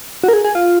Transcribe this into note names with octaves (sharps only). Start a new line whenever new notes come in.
F#4
A#4
G#4
G#4
F4